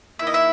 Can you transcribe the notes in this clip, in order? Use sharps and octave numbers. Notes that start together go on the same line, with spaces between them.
D#3 A#3 E4 E5
D#5
E5